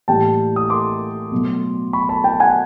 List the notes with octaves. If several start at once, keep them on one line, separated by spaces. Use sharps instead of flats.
A2 E3 G3 A#3 G5 A5
D#6
C6 D6
B2 F#3 A3
B5 C#6
A5 B5
G5 A5
F#5 G#5